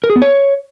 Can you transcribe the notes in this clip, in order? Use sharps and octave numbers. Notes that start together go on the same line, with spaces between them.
A#4
G#4
B3
C#5